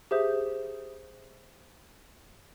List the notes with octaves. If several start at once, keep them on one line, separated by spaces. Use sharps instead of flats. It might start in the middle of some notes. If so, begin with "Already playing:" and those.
G4 G#4 C5 E5 D#6 G6